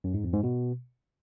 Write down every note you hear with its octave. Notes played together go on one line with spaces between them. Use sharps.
F#2
G#2
F2
G#2
B2